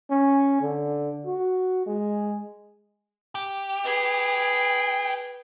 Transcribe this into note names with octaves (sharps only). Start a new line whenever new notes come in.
C#4
D3
F#4
G#3
G4
G#4 B4